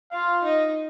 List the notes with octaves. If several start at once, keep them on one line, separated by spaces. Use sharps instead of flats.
F4 F5
D#4 D#5